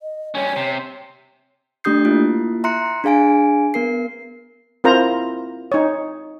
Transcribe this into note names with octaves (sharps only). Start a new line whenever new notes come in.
D#5
G3 C#4 C#5
C3
A3 D4 G4 D#6 G6 C7
A#3 E4 F4
E5 A#5 C6 F#6 C#7
D4 G#4 F5 G#5 D7
B3 A#4 C7
C4 E4 F4 A#4 C5 A#5
D#4 C#5